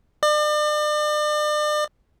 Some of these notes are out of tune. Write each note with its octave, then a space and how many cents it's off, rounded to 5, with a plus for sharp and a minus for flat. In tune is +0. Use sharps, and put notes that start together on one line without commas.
D5 +40